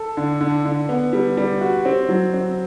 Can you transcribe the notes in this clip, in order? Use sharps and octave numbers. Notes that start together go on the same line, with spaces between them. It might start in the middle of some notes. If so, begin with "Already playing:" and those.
Already playing: A4
D3
D3
D3
B3
G3
G3
F#4
C4
F#3
C4